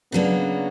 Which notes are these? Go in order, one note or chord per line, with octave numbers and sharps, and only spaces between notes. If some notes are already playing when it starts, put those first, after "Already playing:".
C#3 F#3 A#3 B3 D4